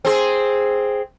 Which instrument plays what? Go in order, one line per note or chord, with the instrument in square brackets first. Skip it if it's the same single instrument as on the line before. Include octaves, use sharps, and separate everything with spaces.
[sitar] C4 G#4